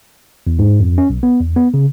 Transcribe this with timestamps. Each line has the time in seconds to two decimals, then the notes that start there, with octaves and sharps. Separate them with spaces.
0.47 E2
0.59 G#2
0.80 F2
0.98 C#4
1.10 B1
1.23 B3
1.41 E2
1.56 B3
1.74 C#3